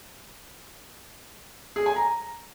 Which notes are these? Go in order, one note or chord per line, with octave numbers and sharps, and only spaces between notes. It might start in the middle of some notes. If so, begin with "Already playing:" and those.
G#4
G#5
A#5